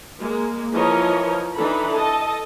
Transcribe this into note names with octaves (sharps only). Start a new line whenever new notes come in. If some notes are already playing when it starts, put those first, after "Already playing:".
G#3 A#3
E3 F3 A#4 C#5 D#5
E3 D4 D#4 A4 B5
A4 D#5 A5